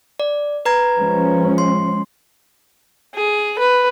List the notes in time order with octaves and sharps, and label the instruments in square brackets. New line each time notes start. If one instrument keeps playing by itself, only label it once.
[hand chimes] D5
B4 A#5 G#6
[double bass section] F3 G#3 C#4
[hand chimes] C6
[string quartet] G#4
B4